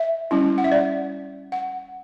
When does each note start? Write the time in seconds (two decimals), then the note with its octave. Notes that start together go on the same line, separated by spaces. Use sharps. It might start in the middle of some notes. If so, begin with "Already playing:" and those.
Already playing: E5
0.31 G3 C#4 E4
0.58 F#5
0.64 E5
0.72 D5
1.52 F#5